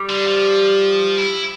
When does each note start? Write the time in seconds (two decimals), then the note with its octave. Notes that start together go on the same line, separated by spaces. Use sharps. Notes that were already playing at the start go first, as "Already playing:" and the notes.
Already playing: G3
0.10 D3
0.27 F3
1.17 E4